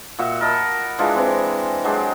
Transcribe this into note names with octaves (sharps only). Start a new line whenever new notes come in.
A#2 F#4 E5
A#4 D#5 A5 B5
E3 G#3 D4 F4
E3 C4
F#3 G#3 D4 G4